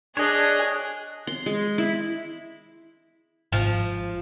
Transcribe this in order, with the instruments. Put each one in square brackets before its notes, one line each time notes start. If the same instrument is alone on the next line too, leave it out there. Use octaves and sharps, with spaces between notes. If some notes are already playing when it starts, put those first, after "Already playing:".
[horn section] D4 [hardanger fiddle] G#4 [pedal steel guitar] C#5 D#5 [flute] F#6
[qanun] C6
G#3
E4
[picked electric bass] G#1 [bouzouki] F3